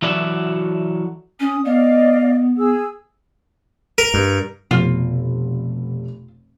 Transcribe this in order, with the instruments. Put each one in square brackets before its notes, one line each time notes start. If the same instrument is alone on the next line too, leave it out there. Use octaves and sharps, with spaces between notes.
[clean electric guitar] E3 F#3 F#4 A4 D5 E5
[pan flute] C#4 [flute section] D#6
[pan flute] B3 [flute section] D5 D#5 F5
[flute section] G#4 E6
[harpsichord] A#4
[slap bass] G2
[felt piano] F1 [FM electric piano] B2 [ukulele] F4